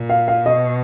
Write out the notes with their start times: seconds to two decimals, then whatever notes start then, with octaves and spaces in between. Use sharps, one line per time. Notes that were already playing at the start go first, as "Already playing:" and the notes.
Already playing: A#2
0.09 F5
0.28 F5
0.45 B2 D#5